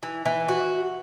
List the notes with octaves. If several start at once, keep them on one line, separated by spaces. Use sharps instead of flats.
E3
E3
F#4